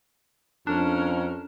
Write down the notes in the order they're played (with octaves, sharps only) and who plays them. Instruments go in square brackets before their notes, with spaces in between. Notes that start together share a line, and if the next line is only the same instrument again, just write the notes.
[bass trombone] F2 [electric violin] C#4 A#4 [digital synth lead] D4